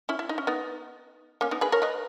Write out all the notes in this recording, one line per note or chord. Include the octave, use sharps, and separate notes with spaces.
C#4 E4
E4
D#4
C#4
B3 D#4
A#3 C#4
B3 D#4
G#4 B4
A#4 C#5
B4 D#5